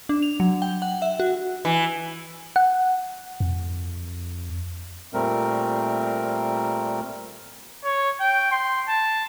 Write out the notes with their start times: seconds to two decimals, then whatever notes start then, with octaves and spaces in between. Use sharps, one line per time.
0.09 D4
0.23 F7
0.40 F#3
0.62 G5
0.82 F#5
1.02 E5
1.20 F#4
1.65 E3
2.56 F#5
3.40 F2
5.14 A#2 G3 A3 C4 A#4
7.84 C#5
8.20 G5
8.52 C6
8.88 A5